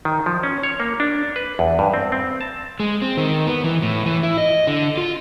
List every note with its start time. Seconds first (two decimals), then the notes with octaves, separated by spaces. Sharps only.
0.05 D#3
0.26 F3
0.43 C#4
0.63 C#5
0.80 A#3
1.00 D4
1.36 B4
1.59 E2
1.79 G2
1.94 C4
2.12 C4
2.41 A5
2.80 G#3
3.02 C4
3.17 D#3
3.47 B3
3.64 E3
3.82 A2
4.06 E3
4.23 E4
4.38 D#5
4.67 D3
4.97 F4